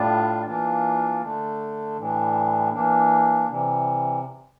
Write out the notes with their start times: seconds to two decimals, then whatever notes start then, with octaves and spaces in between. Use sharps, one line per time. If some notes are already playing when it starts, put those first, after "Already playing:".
Already playing: A2 G3 D4 F4
0.46 E3 A#3 D4 F4
1.22 D3 A3 D4
1.97 A2 E3 G3 D4
2.72 E3 A#3 D4
3.49 C3 E3 G3